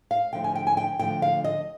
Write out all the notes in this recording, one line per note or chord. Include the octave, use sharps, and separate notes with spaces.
F5
D2 D3 F3 G5
G#5
G5
G#5
G5
D2 D3 F3 G5
F5
D#5